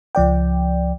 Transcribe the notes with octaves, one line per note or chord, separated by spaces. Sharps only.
C#2 F3 D5 G5